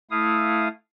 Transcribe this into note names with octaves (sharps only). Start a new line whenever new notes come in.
A3 E4 F5 D#6